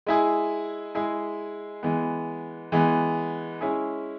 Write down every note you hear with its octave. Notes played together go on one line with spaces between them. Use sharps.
G#3 E4 G#4
G#3 E4 G#4
E3 G#3 B3
E3 G#3 B3
G#3 C#4 E4 G#4